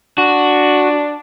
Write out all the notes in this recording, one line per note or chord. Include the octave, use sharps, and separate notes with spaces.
D4 F#4